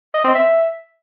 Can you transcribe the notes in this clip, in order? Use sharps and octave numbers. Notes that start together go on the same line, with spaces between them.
D#5
C4
E5